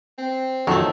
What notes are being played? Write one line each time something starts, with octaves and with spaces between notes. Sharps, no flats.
C4
F2 D#3 F#3 A3